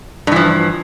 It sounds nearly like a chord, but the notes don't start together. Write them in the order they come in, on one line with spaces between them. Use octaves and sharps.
G2 E3 F3